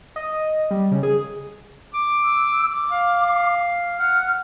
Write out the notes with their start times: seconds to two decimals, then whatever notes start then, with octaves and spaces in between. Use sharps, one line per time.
0.16 D#5
0.71 G3
0.91 C#3
1.03 G#4
1.94 D6
2.24 E6
2.70 D6
2.91 F5
4.00 F#5 F6